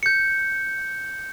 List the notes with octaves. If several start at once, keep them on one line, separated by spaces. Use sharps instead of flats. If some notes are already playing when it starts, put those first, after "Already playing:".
G6 C#7